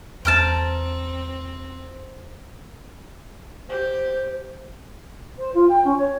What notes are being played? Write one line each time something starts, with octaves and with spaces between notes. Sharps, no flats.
E2 C4 G5 A5 A#5 F6
G4 C5
C5
F4
G5
C#4
C#5